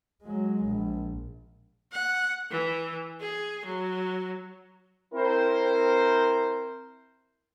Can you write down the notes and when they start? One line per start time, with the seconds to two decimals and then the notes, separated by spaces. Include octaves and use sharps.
0.23 F#3 G#3
0.65 A#1
1.92 F#5
2.51 E3
3.21 G#4
3.65 F#3
5.14 C4 E4 A#4 C5